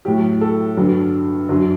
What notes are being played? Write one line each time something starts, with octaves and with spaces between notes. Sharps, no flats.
A2 F#3 G4
A4
G2 D3 F#3
F#2 D3 F#3